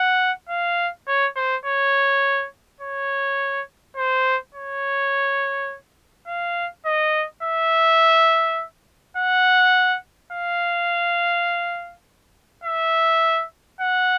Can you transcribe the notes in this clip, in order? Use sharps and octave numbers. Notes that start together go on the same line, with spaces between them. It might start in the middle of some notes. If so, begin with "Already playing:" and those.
Already playing: F#5
F5
C#5
C5
C#5
C#5
C5
C#5
F5
D#5
E5
F#5
F5
E5
F#5